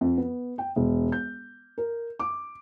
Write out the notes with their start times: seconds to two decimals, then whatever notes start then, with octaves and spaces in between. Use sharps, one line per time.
0.01 F2
0.17 B3
0.58 G5
0.76 E1
1.12 G6
1.78 A#4
2.20 D6